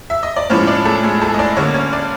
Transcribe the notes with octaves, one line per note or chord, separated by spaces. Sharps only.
E5
D#5
D5
A2 F3 G#3 B3 C#4 C#5
D4 D5
A3 A4
G#3 G#4
A3 A4
D#5
D4 D5
D3 G3 A#3 C#4 C#5
C#4 C#5
D4 D5